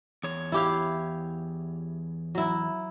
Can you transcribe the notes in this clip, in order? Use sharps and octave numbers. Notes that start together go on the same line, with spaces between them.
E2 C#5
E4 G4 F5
F#3 E4